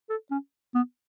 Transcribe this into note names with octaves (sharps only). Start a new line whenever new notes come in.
A4
C#4
B3